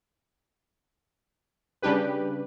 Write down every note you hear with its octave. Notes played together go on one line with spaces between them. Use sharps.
C#3 G3 D4 G4 B4